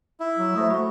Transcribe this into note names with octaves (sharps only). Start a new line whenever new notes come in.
E4
F#3
A3 C5 E5 D#6
F#4 B5 C#6